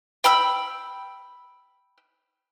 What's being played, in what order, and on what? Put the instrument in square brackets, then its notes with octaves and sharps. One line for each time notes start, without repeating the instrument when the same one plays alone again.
[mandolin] G5 B5 E6